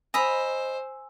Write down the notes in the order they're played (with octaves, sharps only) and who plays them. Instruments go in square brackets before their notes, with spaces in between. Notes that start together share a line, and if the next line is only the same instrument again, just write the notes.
[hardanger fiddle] C5 [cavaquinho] D#5 A#5 B5 [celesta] G#5 E6